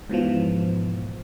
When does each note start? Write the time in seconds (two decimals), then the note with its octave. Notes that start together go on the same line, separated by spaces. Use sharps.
0.09 G#2 B2 E3 F3